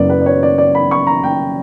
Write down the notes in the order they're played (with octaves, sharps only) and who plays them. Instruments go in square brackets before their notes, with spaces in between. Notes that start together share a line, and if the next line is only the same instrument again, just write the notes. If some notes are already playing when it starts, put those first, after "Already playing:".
Already playing: [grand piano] F#1 F#2 C#3 F#3 B3 D5
B4
D5
C#5
D5
D5
B5
C#6
A#5
G5